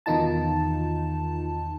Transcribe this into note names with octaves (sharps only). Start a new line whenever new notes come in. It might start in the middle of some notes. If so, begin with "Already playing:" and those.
E2 B2 D#3 D#4 F4 A5